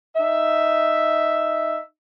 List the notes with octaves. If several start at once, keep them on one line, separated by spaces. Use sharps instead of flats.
D#4 E5